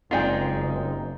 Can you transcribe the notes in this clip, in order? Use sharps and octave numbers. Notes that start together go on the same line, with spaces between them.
F#1 G#3 C4 D#4 F4 D5 G5 G#5